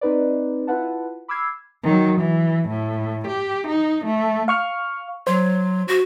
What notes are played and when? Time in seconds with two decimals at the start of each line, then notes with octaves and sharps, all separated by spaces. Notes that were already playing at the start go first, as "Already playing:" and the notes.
0.01 C4 D#4 B4 D5
0.67 E4 F4 B4 F#5 A5
1.28 B5 D6 E6 F6 G#6 C7
1.83 D#3 F#3
2.20 E3
2.68 A2
3.27 G4
3.68 D#4
4.05 A3
4.48 F5 C#6 F6
5.27 F#3 C5
5.88 F#4